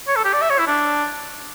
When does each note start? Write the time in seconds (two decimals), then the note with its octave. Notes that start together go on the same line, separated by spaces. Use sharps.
0.08 C#5
0.16 A4
0.25 G4
0.33 D5
0.42 E5
0.50 C#5
0.59 E4
0.67 D4